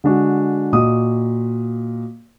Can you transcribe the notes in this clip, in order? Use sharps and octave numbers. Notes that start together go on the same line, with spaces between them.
D3 G#3 D4 F#4
A#2 F#4 D#5 D#6